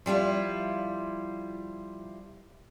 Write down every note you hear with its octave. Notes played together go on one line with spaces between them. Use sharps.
F3 G3 E4 F4